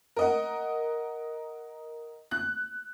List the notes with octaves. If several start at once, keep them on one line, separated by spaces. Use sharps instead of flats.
A#4 D#5 F#5
F#6